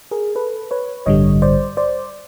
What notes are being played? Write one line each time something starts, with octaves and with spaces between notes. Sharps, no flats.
G#4 A#4
A4 B4
B4 C#5
A1 G2 D3 G3 C#5 D#5
C5 D5
C5 D5